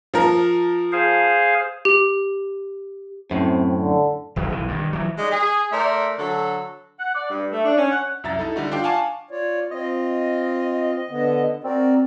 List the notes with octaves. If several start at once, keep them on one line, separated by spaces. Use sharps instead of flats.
F3 A#4
G#4 C5 F5
G4
F#2 A2 C4
D3
F#1 E2 D#3 F#3
B1 E3
G2 D#3
E3 F#3
G#3 D#4 F#4 D5 D#5
G#4
A3 A#4 C5 D5 E5
D3 F#3 F#4 A4
F#5
D5
G2
A3
D4
C#4
F#5
C2 F#2 E5 A#5 A6
D#4 E4 A4
D3 G3 D#4 F#4
D4 F4 D5 F5 G5 D6
F5 F#5 G#5 A5 C#6 D6
F4 C#5 D5
C4 F4 D#5
D3 B3
C4 F#4 A#4 D5